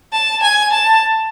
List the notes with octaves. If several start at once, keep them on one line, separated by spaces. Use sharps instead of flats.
A5
G#5
A5